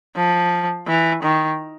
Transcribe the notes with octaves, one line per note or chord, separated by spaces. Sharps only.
F3
E3
D#3